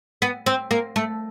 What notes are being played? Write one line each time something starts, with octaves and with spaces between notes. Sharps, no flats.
B3
C4
A#3
A3